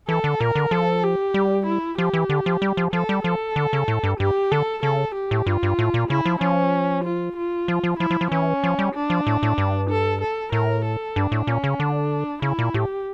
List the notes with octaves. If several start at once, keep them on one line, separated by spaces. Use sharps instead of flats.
E3 A4
D3
A#2 A#4
D3
F3 A4
G4
G3
E4
F3 G4
E3
D3
F3
G3
F3
F3 A4
G3
F3 A4
D3
C#3
A2
G2
G2 G4
D3 A4
C#3 A4
G4
A2
G2 F4
G2
A2
A#2
C#3 E4
F3
F3 C#4
F4
F4
F3
F3
F3 E4
F3
F3
E3 C#4
F3
G3
D4
F3
A2
A2
G2
A4
A4
A2 A#4
A4
G2 D4
A2
A#2 C#4
C#3
D3 D4
C#3 E4
A#2
A2 G4